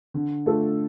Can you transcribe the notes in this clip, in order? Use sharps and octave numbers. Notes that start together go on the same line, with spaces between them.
D3
A3 D4 F4 A4